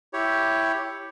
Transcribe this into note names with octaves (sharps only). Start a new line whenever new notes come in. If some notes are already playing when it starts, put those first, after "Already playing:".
E4 G4 C#5